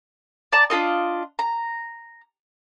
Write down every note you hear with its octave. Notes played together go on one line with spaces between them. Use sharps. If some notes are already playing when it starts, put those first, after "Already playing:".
D5 A5 A#5
D4 F4 A#4 D#5
A#5